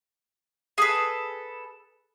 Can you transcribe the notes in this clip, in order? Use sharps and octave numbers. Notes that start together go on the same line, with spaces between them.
G#4 A4 B4